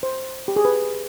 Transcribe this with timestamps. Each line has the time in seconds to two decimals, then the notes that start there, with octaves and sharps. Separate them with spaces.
0.03 C5
0.48 G4
0.56 G#4
0.65 B4